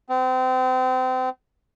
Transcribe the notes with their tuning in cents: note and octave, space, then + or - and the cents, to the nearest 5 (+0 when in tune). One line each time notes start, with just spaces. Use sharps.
C4 -30